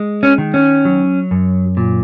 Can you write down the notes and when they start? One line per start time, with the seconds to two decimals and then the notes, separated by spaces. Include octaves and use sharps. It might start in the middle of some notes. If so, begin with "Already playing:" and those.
Already playing: G#3
0.23 C#4
0.38 D#3
0.54 C#4
0.85 F#3
1.31 F#2
1.77 A#2